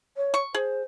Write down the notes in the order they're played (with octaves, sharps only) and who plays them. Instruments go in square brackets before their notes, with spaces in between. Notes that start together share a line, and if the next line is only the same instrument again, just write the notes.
[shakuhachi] C#5
[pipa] C#6
[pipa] G#4 [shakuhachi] C5